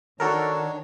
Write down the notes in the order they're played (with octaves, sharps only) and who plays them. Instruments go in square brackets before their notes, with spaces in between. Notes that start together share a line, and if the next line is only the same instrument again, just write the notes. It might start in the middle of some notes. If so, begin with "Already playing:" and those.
[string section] D#3 [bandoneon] D4 C#5 [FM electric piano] F#4 A4 A#4